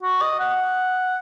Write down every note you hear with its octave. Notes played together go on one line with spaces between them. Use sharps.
F#4
D#5
F#5